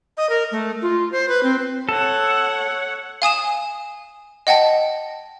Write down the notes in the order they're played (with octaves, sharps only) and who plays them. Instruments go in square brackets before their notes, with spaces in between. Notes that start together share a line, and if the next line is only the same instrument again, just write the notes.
[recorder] D#5
A#4
A3
F4
C5
B4
C4
[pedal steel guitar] A4 [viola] C#5 F#5
[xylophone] F5 G#5 D#6 E7
D#5 F#5 G5 A5